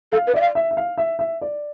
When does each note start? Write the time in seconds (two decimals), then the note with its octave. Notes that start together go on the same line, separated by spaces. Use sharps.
0.12 A4 F5
0.27 B4
0.34 D5 E5
0.41 F5
0.55 E5
0.71 E5
0.77 F5
0.98 E5
1.19 E5
1.41 D5